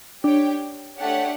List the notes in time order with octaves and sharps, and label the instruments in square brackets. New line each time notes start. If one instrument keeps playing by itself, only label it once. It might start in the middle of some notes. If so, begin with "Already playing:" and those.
[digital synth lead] D4 [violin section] G4 C#5 G5
[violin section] A3 D4 G4 C#5 F#5